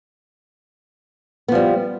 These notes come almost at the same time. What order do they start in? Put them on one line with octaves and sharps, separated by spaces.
B3 F3 G3